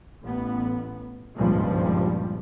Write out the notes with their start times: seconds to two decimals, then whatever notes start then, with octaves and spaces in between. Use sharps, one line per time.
0.24 A1 B3
1.37 G#1 C#2 G2 A#2 F3 G3